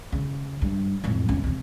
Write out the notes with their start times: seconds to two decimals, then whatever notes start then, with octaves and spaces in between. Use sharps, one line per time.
0.12 C#3
0.61 G2
1.04 F2 A2
1.29 E2 C#4
1.44 E2 C3